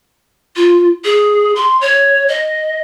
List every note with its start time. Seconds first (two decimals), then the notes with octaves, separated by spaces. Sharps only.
0.56 F4
1.05 G#4
1.56 C6
1.81 C#5
2.28 D#5